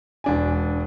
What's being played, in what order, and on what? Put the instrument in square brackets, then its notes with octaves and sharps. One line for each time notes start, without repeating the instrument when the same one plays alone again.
[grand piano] E1 D4 G#5